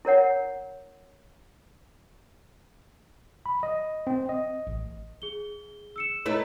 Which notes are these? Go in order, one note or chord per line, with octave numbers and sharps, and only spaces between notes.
E4 A#4 C#5 F#5
B5
D#5
C4
D#5
A1
G#4 G7
E6 C#7 E7
A3 E4 B4 C#5 D#5 A#5